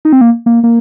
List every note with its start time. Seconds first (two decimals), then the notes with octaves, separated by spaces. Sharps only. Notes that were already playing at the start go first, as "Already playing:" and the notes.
0.05 D#4
0.13 C4
0.21 A#3
0.46 A#3
0.64 A#3